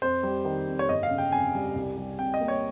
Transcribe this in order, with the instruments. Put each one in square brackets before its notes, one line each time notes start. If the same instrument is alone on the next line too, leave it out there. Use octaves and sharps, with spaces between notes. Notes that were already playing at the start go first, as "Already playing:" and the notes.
[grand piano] F2 C5
G3
D#3
F2
C#5
G1 D#5
F5
C#3
G5
F2 G#5
G3
C2
G3
C3 G5
D#5
A#3
C#5